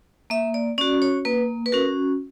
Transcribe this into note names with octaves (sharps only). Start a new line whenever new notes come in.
A#3 E5
D5
C#4 F#4 D5
C#5
A#3 B4
B4
C#4 F#4 A#4